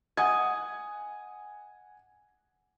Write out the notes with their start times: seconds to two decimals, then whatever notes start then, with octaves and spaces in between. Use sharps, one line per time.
0.17 D#5 F#5 G#5 G#6